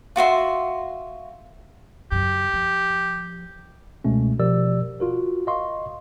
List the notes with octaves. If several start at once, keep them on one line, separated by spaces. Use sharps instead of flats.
F4 F#4 E5 C6
F#2 C#3 G4
F3
C#2 B2 G#3 A3 C#4
B2 F3 G4 A#4 D5 E6
F4 F#4 A#4
D#5 F5 C6 C#6